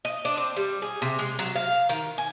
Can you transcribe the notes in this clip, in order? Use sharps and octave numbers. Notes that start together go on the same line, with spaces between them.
D#5
D4
C4
G3
G#4
C3
G#3
F#3
F5
D#3
G#5